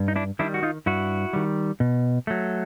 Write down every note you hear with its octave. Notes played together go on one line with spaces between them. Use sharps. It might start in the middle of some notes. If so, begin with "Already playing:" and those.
Already playing: G2
D#4
D4 E4
D#3 G3 D4 E4
F#4
D#4 F4
G2 E4 F#4
D#3 G3
B2
F#3 A3